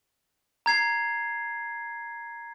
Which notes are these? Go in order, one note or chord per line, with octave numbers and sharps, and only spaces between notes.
A#5 G#6 C7